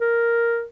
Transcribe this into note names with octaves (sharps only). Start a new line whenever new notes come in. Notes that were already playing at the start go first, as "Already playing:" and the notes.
A#4